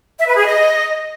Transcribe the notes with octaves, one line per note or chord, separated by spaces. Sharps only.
E5
B4
G#4
D#5